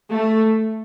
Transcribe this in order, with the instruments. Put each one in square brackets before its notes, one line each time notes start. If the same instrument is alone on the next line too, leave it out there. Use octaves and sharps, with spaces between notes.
[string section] A3